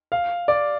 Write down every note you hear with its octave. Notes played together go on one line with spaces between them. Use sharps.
F5
D5